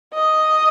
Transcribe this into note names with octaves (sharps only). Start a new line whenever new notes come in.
D#5